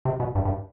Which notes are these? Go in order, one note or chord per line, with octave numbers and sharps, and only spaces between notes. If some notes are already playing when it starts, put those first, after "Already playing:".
C3
B2
G2
G2